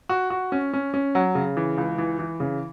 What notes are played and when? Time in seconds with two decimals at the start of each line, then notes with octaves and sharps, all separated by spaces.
0.09 F#4
0.30 F#4
0.52 C#4
0.73 C#4
0.94 C#4
1.15 F#3
1.35 C#3
1.57 E3
1.78 C#2
1.98 E3
2.19 E3
2.40 C#3